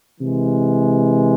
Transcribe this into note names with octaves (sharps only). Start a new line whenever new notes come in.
C3 E3 G#3